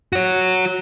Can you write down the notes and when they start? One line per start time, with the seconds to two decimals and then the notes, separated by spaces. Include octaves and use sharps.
0.13 F#4 C#5